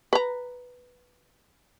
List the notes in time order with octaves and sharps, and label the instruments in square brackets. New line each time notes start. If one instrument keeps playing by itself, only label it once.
[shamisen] B4 A#5